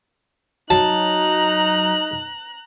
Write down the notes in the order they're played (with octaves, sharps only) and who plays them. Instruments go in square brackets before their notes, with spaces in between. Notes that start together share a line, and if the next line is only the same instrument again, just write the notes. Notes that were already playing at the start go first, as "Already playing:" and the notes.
[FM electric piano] F#3 [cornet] D#4 [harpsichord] A5 [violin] A#5 F#6